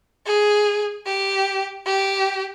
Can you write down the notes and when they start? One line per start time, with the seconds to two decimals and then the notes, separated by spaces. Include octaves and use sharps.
0.26 G#4
1.06 G4
1.86 G4